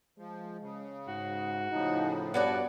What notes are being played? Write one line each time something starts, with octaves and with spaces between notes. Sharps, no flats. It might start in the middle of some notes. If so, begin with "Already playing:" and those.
F3 G#3
C#3
G#2 F#4
A2 C#3 F3 D#4
G2 F3 B3 F#4 C#5 D5